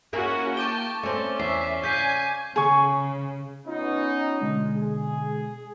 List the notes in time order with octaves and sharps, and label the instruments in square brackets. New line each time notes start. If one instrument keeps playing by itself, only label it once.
[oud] A#3 E4 G#4 [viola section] C#4 F#4
[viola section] G5 A5 [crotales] C#6 D6 G7
[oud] A3 C4 [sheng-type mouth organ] C#4 D5 [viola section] A4
[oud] E2 [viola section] E5 [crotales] C7
[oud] C#3 [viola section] G#5 [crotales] G6 B6 C7
[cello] C#3 [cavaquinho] G#4 C#6
[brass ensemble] B3 C#4 D#4 [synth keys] F4
[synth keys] B2 D3 G#3
[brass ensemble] G#4